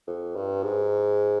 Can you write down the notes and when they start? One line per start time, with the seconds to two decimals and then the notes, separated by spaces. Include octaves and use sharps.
0.07 F2
0.36 G2
0.63 G#2